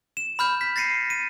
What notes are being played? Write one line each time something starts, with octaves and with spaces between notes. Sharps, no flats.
E7
B5 F6 G6
B6
A6 A#6 C7 C#7 D#7
D#7